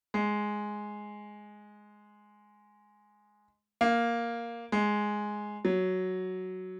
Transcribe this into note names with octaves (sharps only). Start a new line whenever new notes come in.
G#3
A#3
G#3
F#3